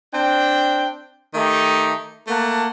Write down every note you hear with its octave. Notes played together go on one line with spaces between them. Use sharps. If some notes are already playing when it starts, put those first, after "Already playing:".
C4 D4 G5
D#3 A3 D#4 G4
A3 A#3 F#5 A5